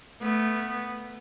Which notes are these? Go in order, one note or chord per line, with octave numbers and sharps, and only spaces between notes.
A3 B3